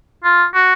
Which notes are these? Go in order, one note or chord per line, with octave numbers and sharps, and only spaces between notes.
F4
F#4